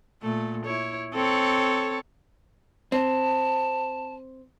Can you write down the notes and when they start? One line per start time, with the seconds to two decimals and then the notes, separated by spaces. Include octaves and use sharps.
0.22 A#2 A3
0.66 E4 C#5
1.13 C4 A4 C#5
2.92 C4 A5